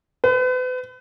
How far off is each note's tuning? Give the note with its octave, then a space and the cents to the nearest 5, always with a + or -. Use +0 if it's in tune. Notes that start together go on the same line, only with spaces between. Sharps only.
B4 +40